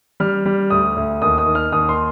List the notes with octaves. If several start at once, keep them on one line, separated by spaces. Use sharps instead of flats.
G3 F6
G3
D2 D#6
D2
D#2 D#6
D#6
D#3
F6
D#2 D#6
C6